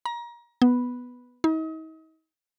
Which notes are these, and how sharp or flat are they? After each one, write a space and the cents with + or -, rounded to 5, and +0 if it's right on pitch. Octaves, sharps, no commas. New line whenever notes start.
A#5 +30
B3 +0
D#4 +40